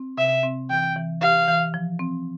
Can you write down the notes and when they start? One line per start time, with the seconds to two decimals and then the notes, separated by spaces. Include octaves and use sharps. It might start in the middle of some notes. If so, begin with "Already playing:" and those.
Already playing: C4
0.18 C3 E5
0.43 C4
0.70 E3 G5
0.96 E3
1.21 G4 F5
1.48 E3
1.74 F3
1.99 C4